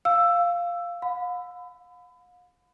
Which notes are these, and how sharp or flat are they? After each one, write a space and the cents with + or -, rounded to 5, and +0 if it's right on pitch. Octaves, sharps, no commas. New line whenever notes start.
F5 +0 E6 +10
F5 +45 B5 +30